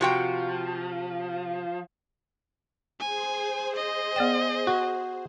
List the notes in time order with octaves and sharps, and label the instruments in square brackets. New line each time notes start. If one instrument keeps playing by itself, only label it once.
[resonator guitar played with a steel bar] C3 F#4 G5 [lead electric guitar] F3
[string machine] G#4 C5 [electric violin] G#5
[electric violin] D#5
[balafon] B3 D5 G5
[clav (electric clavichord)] F#4